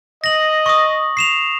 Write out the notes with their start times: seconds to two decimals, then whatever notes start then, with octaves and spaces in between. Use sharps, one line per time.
0.24 D#5 A#6 F#7
0.66 C#6 D#6
1.17 C7 E7 F7